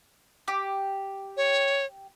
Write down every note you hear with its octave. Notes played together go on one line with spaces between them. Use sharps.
G4
C#5